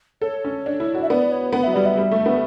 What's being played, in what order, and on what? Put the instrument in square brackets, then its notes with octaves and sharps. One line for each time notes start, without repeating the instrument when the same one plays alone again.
[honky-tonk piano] A4 [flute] C#5
[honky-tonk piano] C#4
D4
E4
F#4
[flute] E5
[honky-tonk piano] B3 [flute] D5
[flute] C#5
[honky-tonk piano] B3 [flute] F#5
[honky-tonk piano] F#3 [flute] E5
[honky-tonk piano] G3 [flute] D5
[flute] E5
[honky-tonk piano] G3
A3
B3